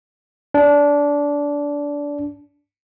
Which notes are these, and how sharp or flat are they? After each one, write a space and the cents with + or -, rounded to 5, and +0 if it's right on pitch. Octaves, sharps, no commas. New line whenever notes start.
D4 -20